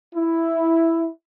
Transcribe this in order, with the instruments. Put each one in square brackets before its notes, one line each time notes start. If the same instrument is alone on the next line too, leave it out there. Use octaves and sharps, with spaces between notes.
[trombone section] E4